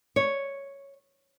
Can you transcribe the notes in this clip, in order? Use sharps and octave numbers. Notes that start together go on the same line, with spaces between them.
C#5